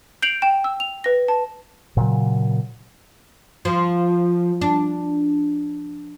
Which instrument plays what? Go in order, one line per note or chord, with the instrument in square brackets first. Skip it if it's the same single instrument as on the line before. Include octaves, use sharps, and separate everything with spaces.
[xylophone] G6 C7 D7 F7 F#7
G5 E7
E6
F7
B4 A#6
A5
[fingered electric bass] A#2 C#3 F#3
[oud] F3
D4